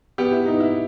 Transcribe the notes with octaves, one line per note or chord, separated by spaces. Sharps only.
B3 G4
E4
B3 D#4
E4